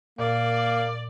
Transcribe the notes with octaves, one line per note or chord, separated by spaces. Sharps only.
A#2 A#3 D5